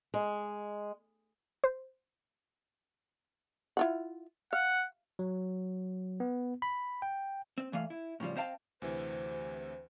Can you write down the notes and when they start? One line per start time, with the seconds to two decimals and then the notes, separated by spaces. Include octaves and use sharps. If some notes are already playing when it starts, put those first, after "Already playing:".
0.14 G#3
1.64 C5
3.77 E4 F4 F#5
4.53 F5 F#5
5.19 F#3
6.20 B3
6.62 B5
7.02 G5
7.58 C4
7.72 G2 E3 A3 F5
7.90 E4
8.20 A2 C#3 F3 G3
8.36 C4 C5 D#5 F5 G5 A5
8.82 D2 C3 E3 C5